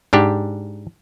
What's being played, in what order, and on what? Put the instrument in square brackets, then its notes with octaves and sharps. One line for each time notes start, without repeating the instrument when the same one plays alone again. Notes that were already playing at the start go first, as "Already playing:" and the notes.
[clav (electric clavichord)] G#2 D4 G4